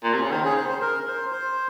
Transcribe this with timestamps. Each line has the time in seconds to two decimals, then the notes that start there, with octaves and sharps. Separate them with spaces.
0.04 A#2
0.14 C3
0.22 C#3
0.31 D#3 C5
0.44 C#3 G#4
0.57 C5
0.69 C5
0.82 A#4
1.07 C5
1.32 C5